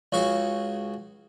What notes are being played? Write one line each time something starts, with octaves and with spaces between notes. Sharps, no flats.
C#2 C#3 F#4 G#4 C#6